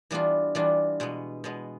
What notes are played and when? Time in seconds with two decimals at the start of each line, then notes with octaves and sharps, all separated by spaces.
0.11 E3 G3 B3 D4 F4
0.55 E3 G3 B3 D4 F4
1.00 B2 G#3 B3
1.44 B2 G#3 B3